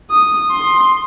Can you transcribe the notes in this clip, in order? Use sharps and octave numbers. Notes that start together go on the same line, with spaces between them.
D#6
C6